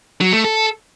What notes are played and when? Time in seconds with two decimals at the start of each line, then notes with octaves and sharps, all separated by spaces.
0.21 F#3
0.33 A3
0.44 A4